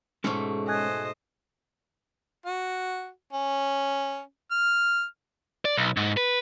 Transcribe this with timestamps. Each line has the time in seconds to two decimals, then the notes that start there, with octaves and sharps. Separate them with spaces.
0.24 G#2 B2 G#3 A3 C#4 C#5
0.68 C5 D#5 G#5 F#6 G#6
2.46 F#4
3.33 C#4
4.51 F6
5.65 D5
5.77 B1
5.97 G#2
6.17 B4